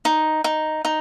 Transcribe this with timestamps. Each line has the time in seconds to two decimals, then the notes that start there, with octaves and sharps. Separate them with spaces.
0.05 D#4
0.44 D#4
0.85 D#4